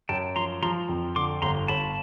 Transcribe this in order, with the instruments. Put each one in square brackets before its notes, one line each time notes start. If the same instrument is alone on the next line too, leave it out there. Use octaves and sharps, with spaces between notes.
[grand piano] F#2 [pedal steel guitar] G5 A5
[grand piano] F3 [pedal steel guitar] A#5 C6
[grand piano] F3 [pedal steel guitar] A#5 C6
[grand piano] F2
[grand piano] D3 [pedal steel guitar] C6 D6
[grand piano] G1 [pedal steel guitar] A#5 C6
[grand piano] G1 [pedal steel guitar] A5 B5